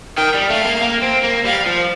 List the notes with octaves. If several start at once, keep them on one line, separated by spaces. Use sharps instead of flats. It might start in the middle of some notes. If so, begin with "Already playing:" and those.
D#3 G5
G3
A3 F5
A#3
A#3
C4
A#3
G3 F5
F3